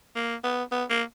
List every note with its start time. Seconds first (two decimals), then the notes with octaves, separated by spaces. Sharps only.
0.15 A#3
0.44 B3
0.72 B3
0.90 A#3